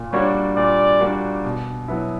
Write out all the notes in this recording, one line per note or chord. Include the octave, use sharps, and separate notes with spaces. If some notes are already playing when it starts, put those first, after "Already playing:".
Already playing: A#2
G3 A#3 D4 F#4 C#5
A#2 D5
G3 A#3 D4 F#4
B2
F#3 B3 E4